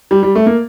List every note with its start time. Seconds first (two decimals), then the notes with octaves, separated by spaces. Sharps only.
0.11 G3
0.23 G3
0.35 A3
0.46 A#3